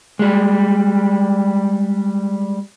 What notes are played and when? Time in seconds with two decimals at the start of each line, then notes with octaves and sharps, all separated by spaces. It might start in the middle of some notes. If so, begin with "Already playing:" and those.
0.19 G3 G#3